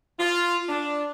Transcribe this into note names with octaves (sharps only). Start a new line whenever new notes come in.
F4
D4